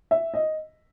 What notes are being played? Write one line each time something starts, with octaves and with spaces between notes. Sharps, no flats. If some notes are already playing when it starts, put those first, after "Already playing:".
E5
D#5